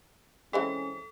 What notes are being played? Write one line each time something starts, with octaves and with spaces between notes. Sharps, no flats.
E3 G#3 C4 C#4 A4